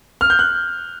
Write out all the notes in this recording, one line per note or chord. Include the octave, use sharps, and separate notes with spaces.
F6
G6
F#6